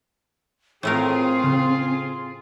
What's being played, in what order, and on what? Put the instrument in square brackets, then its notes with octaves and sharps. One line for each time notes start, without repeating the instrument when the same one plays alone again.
[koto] A2 A3 A#4 [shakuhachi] C4 [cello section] F4 G#4
[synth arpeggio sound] C#3